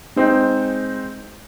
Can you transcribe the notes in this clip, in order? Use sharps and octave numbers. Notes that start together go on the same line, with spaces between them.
G#3 C4 D#4